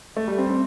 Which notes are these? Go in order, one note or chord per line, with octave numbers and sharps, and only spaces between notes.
A3
G3
C4
C4